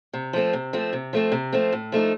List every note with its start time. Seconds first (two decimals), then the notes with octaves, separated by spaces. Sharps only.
0.13 C3
0.33 F3 A3 C4
0.53 C3
0.73 F3 A3 C4
0.93 C3
1.13 F3 A3 C4
1.32 C3
1.53 F3 A3 C4
1.72 A2
1.92 F3 A3 D#4